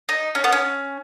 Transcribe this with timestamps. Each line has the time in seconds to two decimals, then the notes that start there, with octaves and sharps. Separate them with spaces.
0.09 D#4
0.35 C#4
0.44 B3
0.52 C#4